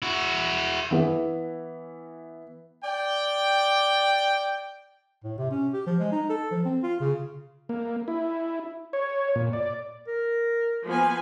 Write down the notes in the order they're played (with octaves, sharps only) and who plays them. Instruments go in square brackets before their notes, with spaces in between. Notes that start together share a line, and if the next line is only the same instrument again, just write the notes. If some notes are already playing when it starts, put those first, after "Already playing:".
[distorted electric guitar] E4 F#4
[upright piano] E3 B3
[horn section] D5 G5
[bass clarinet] A2
C3
C#4
G4
F3
G#3
D#4
A4
F3
C4
F4
C#3
[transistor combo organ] A#3
E4
C#5
A#2
D5
[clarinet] A#4
[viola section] F3 B3 G#5 [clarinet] A#3